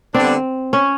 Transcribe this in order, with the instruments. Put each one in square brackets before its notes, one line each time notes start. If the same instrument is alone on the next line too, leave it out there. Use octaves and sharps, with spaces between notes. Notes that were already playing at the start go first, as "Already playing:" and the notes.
[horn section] D3 G3 B3 D4 [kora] C4
[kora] C#4